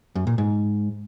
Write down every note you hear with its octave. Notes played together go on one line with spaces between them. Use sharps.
F#2
A#2
G#2